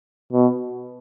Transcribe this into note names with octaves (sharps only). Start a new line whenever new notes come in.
B2